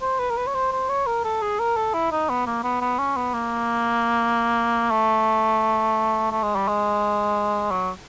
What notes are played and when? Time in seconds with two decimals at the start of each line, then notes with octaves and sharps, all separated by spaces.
0.02 C5
0.19 B4
0.30 A#4
0.37 B4
0.47 C#5
0.54 C5
0.72 C5
0.89 C#5
1.07 A#4
1.24 A4
1.42 G#4
1.59 A#4
1.77 A4
1.94 E4
2.12 D#4
2.29 B3
2.47 A#3
2.64 B3
2.81 B3
2.99 C#4
3.16 B3
3.34 A#3
4.91 A3
6.31 A3
6.43 G#3
6.56 G3
6.68 G#3
7.71 F#3